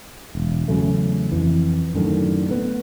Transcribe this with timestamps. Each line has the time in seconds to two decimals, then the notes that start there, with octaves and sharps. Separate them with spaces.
0.35 E1
0.68 E2 C#3 F#3 A3
1.32 F2 E3
1.94 F#2 A2 D3 D#3
2.49 A3 B3